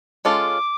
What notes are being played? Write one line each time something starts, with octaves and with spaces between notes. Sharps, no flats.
G#3 C#4 F4 A4 D6